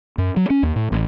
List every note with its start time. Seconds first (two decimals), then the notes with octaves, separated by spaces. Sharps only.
0.18 F#2
0.37 F#3
0.50 C#4
0.63 D#2
0.76 A2
0.92 A1